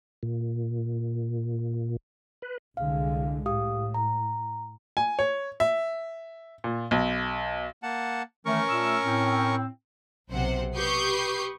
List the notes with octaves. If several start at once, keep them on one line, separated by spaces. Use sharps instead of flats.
A#2
B4
C2 D3 G#3 F5
A2 G4 F5 D#6
A#5
G#5
C#5
E5
A#2
B1
A#3 F#5 A5
D#3 E3 A3 C#4 A#4 C#6
A#2 A3 E6
A2 C4
B1 C3 C5 F#5
G4 B4 C#6 D#6 G6 C7